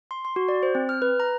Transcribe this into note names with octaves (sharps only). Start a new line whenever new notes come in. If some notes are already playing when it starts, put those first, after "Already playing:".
C6
C6
F#4
D5
C5
C4
F6
B4
A#5